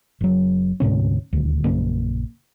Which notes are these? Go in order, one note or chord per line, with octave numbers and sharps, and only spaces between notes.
F#1 F#3
D2 G#2 C3 C#4
D#1 D2
A#1 F#2 C#3 A#3